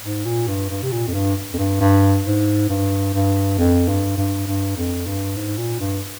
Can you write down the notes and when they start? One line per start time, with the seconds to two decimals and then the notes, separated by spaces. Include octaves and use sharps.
0.03 G#2
0.25 A#2
0.48 G2
0.70 G2
0.83 C3
0.92 A#2
1.07 F2
1.14 G2
1.54 F2
1.58 G2
1.80 G2
2.26 G#2
2.69 G2
3.14 G2
3.58 F2
3.88 G2
4.17 G2
4.47 G2
4.77 F2
5.07 G2
5.36 G#2
5.58 A#2
5.80 G2